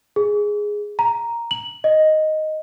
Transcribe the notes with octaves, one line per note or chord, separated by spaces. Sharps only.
G#4
A#5
F#7
D#5